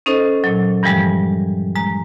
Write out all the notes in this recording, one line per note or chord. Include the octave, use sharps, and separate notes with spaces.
C#4 D#4 A4 C5 D#5
A#2 F#3
G2 E3 F3 G3 G#3
G#3 A#5